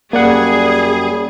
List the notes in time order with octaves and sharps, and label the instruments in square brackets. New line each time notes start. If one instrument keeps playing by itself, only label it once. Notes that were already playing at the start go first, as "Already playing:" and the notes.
[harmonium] F#2 G3 [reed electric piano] A#3 D5 F#5 [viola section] G#4